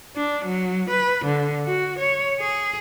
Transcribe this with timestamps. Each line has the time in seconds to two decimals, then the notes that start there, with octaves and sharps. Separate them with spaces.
0.16 D4
0.45 F#3
0.90 B4
1.25 D3
1.67 F#4
1.99 C#5
2.40 G#4